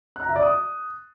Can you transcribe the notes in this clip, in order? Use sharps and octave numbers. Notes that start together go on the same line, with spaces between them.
F#6
A#5
E5
D5
D#6